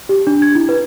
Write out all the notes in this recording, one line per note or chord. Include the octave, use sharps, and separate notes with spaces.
G4
D4
G#6
E4
B4